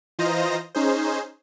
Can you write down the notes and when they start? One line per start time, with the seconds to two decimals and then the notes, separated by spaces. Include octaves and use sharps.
0.19 E3 F4 C5 D#5 A#5 A#6
0.75 C#4 D#4 G#4 C5